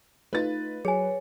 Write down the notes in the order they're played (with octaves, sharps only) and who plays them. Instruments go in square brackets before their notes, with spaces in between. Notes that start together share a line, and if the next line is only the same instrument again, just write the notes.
[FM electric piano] A3 D#4 F4 [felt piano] B4 A6
[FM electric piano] F#3 [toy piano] G#4 G#5 [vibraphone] C#5